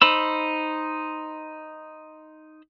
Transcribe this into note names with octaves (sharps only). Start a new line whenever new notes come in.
D#4 C5 B5 E6